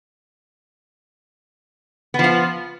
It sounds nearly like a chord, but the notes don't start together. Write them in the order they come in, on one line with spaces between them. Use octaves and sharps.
B3 F3 F4